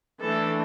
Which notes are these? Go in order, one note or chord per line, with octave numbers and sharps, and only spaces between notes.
E3 A3 D4 A4